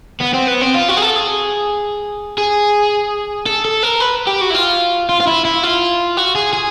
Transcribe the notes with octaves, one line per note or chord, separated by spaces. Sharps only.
B3
C4
B3
C4
F4
F#4
G#4
A4
G#4
G#4
A4
A4
A#4
B4
G4
F#4
E4
F4
F4
F4
E4
E4
F4
F#4
G#4
G#4